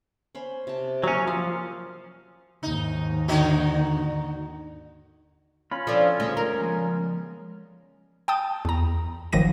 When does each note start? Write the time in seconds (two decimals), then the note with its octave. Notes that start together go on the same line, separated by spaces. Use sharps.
0.35 C#4 C5 B5
0.67 C3 A5
1.04 F#3 A#3 C#4
1.27 F3 F5
2.63 D#2 G#2 D#4
3.28 D3 D#4 F#4
5.72 C#4 F4 B5
5.87 F3 D4 A4
6.20 D2 G#3
6.37 A#4 A#5
6.61 F3 G#3
8.28 G5 A5 D#6
8.65 E2 A#5
9.32 G#1 D#3 F3 F#3 A#6 D#7